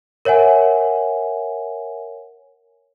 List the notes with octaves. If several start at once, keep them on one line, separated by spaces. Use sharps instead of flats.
A#4 C#5 E5 F#5 G#5